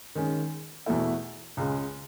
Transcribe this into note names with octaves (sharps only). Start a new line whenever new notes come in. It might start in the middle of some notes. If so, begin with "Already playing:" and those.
D#3 G#3 C#4
E2 B2 A3 E4
C#2 C#3 G#3